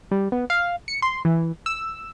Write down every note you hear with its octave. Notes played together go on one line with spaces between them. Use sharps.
G3
B3
F5
C#7
C6
E3
E6